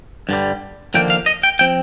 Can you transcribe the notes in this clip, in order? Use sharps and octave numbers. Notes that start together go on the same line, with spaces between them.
G2 D3 G3
D#2 D3 F3 A#3 G5
F5
D#5
G5
F3 C4 G5